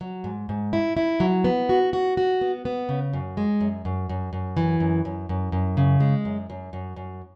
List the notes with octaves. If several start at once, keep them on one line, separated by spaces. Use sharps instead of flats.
F#3
G#2
G#2
E4
E4
F#3
B3
F#4
F#4
F#4
B3
B3
C#3
F#2
G#3
F#2
F#2
F#2
F#2
E3
F#2
F#2
F#2
F#2
C#3
G#3
F#2
F#2
F#2
F#2